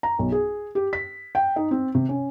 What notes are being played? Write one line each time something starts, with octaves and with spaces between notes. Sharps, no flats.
A#5
B1
G#4
G4
B6
G5
D#4
C4
C3
C#4